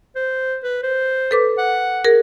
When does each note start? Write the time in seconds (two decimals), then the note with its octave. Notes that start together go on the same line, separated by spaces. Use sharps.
0.15 C5
0.63 B4
0.83 C5
1.31 A4 B4 D6
1.58 F#5
2.05 G#4 A#4